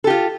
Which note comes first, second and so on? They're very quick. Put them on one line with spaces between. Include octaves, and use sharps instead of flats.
A4 G4 F4